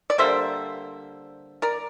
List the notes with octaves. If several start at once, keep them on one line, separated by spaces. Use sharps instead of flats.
D5
D3 G3 A#3 C5 E5
A#4 D5